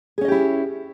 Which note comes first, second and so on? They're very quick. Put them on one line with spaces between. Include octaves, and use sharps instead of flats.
G#4 C#4 D#5 G4 E4